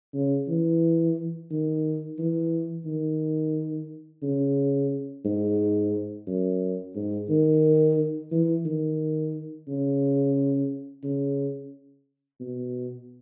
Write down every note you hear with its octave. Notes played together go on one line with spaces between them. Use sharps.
C#3
E3
D#3
E3
D#3
C#3
G#2
F#2
G#2
D#3
E3
D#3
C#3
C#3
B2